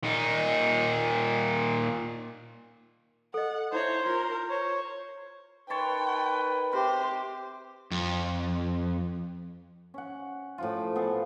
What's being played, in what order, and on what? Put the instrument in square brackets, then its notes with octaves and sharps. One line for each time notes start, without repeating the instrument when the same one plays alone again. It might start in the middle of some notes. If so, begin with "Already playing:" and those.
[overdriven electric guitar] A#2 D#4
[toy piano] A4 D#5 [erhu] F#5
[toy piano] D#4 E4 E5 [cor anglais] C5 [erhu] C#5
[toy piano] F4 [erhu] A#4
[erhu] C5 [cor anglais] C#5
[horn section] D#4 A#4 B4 [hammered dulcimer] C#5 A5 C6 [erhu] G5
[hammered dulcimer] C3 [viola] G4 [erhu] C5
[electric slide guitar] F2
[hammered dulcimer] C#4 F#5
A2 F3 F4
B3 G#4 A4